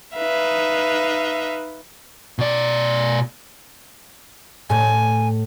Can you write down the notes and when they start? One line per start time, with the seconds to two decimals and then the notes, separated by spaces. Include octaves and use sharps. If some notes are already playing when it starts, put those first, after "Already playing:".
0.16 D#4 B4 E5 F5
2.39 B2 D5
4.70 A2 G#5